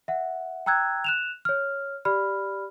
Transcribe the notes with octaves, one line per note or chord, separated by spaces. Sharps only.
E5 F#5
G5 A#5 E6 F#6 G#6
F#6 E7 F7
C#5 F6
G4 D5 B5 F6